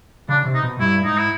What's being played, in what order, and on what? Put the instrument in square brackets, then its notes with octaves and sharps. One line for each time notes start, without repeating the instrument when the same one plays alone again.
[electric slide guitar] C#3 [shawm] D4
[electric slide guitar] C3
[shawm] D#4
[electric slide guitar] B2
[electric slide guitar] G2 [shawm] E4
[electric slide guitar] G#2 [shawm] D#4
[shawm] E4